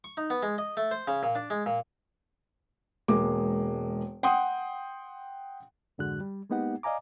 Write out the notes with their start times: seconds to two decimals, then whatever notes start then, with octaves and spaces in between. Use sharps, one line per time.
0.04 C#6
0.17 D#4
0.30 B3
0.43 G#3
0.58 D#5
0.77 A3
0.91 C5
1.08 C#3
1.23 A#2
1.35 D4
1.50 G#3
1.66 A#2
3.08 E1 G#3 A#3 D6
4.23 F#5 G5 C6 D#6
5.98 F2 G#2 D3 G#3 F#4 F#6
6.21 G3
6.50 G#3 A#3 B3 D#4 G4 F#5
6.83 D5 D#5 F5 G#5 A#5 D6